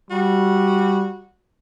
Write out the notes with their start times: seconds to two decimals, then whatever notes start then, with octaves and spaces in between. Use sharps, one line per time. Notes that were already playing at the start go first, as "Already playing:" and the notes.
0.10 G3 F#4